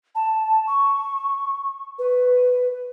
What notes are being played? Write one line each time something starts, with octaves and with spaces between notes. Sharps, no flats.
A5
C#6
B4